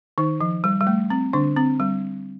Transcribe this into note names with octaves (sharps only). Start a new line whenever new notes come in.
D#3 D#4
F3
G3
G3
A3
C4
D3 D4
C4
G3